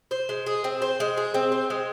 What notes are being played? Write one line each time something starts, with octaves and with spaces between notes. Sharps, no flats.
C5
G#3
G#4
C4
C5
G#3
G#4
C4
C5
G#3